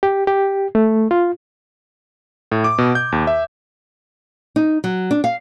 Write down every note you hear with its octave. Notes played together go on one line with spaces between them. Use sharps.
G4
G4
A3
F4
A2
D6
B2
G6
D#2
E5
D#4
F#3
D4
F5